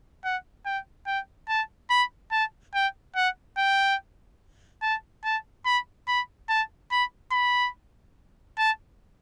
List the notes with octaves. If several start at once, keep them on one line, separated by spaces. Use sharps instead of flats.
F#5
G5
G5
A5
B5
A5
G5
F#5
G5
A5
A5
B5
B5
A5
B5
B5
A5